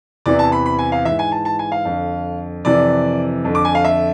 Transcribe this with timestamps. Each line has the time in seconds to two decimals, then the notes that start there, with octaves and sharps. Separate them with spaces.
0.26 E2 C3 E3 D5
0.39 A5
0.52 B5
0.66 B5
0.79 G#5
0.92 F5
1.05 G#2 E3 E5
1.19 G#5
1.32 A5
1.45 A5
1.59 G#5
1.72 F5
1.85 F2 D3
2.65 F2 C3 E3 D5
3.44 F2 D3
3.55 D6
3.65 G#5
3.75 F5
3.84 E5